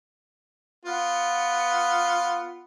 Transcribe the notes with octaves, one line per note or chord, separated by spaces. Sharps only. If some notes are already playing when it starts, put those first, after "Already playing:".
B3 F4 F#5